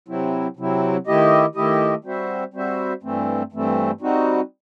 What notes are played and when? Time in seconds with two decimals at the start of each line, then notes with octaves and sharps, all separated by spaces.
0.08 C3 F#3 C4 E4
0.57 C3 F#3 C4 E4
1.07 D#3 A3 E4 G4 D#5
1.55 D#3 A3 E4 G4 D#5
2.04 G3 C4 F#4 C5 E5
2.54 G3 C4 F#4 C5 E5
3.03 G2 E3 A3 C4
3.52 G2 E3 A3 C4
4.01 G3 C4 D#4 F#4